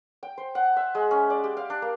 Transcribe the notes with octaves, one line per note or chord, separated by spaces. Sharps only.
G5
C5
F#5
E5
G#3
C#4
D5
G4
F5
D4
A#3